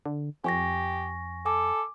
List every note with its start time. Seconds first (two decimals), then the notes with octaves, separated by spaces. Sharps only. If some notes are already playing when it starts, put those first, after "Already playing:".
0.06 D3
0.44 F2 G4 G#5 C#6 A#6
1.46 A4 G#5 D6